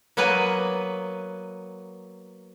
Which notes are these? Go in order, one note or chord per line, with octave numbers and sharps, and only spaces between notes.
F#3 A#3 B3 B4 G#5